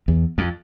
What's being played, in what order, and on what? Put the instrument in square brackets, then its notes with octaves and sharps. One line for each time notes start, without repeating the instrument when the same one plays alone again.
[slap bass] E2
F2